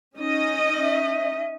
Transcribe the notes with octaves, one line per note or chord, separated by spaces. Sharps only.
C#4 D#4 D#5
E5